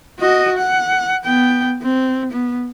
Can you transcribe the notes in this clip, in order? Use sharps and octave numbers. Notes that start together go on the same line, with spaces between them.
F#4 D#5
F#5
B3 G5
C4
B3